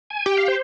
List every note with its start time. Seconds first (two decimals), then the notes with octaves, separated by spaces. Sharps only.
0.10 G#5
0.26 G4 G5
0.37 F5
0.48 C5